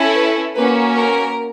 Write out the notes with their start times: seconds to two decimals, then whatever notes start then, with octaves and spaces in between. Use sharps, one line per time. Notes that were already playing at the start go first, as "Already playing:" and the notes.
Already playing: C#4 E4 A4
0.16 B4
0.56 A#3 C#4 F#4 B4
0.96 A#4